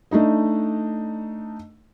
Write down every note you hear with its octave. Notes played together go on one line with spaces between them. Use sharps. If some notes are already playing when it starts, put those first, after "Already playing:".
A3 D4 D#4 D#5